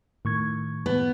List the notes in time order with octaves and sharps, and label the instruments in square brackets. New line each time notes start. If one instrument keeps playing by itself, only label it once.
[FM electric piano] A2 [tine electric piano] D#3 C#6 G#6
[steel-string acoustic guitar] B3